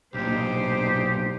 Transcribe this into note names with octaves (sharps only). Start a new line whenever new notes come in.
B1 A#2 D4 D#4 G4 C5